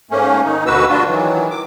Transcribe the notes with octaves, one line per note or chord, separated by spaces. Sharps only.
G#2 A3 A#3 C#4
D#3 D#4
D2 B2 A#3 F#4 B4 E6
G3 D4 F4 F#4
D#3 E3 F#3
D6